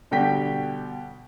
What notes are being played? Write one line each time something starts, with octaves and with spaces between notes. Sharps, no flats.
B2 D3 G3 G5 B6